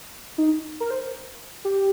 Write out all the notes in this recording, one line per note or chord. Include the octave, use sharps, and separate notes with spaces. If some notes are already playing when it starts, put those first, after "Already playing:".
D#4
A#4
C5
G4